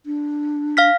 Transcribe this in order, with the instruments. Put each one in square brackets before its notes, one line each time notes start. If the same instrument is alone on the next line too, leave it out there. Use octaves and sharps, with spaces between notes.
[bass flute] D4
[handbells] F5 F6 B6